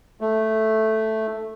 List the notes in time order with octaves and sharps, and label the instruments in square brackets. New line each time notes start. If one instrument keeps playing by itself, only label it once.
[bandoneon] A3